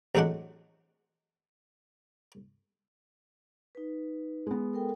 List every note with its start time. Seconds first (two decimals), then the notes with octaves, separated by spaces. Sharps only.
0.15 A1 F2 F#3 G#3 D4 F#5
3.75 D#4 B4
4.47 G#3 B3
4.73 A4 A#4 G5